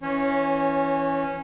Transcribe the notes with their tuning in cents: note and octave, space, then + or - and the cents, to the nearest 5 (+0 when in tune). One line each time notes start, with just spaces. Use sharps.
E3 +0 C#4 +0 C#5 -25